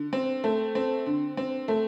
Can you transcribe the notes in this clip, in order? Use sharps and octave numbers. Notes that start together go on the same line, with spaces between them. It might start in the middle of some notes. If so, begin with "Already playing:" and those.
Already playing: D3
C4
A3
C4
D3
C4
A3